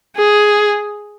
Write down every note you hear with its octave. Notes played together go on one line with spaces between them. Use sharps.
G#4